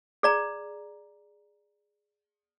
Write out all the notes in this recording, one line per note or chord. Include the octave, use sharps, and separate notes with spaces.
G#4 D5 A#5